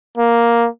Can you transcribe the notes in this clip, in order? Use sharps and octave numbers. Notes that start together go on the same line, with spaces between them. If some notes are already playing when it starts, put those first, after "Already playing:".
A#3